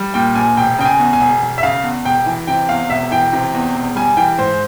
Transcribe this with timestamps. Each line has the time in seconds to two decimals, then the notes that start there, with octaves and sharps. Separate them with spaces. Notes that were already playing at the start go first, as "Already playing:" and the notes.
Already playing: G3
0.14 A#2 G5
0.35 A#1 G#5
0.57 E1 G5
0.79 C#3 G5
0.85 G#5
0.99 E2
1.13 G#5
1.20 E1
1.42 E1
1.58 E5
1.63 C#3 F5
1.84 E2
2.05 E1 G5
2.26 E3
2.47 C3 G5
2.69 E2 F5
2.90 E1 E5
3.11 E3 G5
3.33 C3
3.54 E2
3.75 E1
3.96 G3 G#5
4.17 E3 G5
4.38 G#2 C5